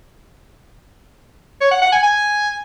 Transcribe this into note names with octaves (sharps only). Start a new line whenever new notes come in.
C#5
F#5
F#5
G#5
G#5